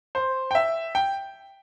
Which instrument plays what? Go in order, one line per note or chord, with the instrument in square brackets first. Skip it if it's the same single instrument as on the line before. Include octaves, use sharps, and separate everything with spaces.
[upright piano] C5
G5
E5
G5